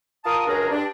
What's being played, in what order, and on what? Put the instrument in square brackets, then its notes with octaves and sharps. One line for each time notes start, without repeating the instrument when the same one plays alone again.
[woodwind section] F4 A#4 F5 A5 D#6
C#2 F#2 C#3 D4 G#4 A#4
G2 D4